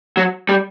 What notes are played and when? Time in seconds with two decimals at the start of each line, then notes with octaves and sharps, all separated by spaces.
0.17 F#3
0.49 G3